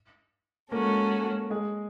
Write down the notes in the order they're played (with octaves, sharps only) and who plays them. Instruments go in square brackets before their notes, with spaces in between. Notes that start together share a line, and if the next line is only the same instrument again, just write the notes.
[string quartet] G#3 C#4 F#4 A4 [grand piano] A#3 A#4
[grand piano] G#3 G#4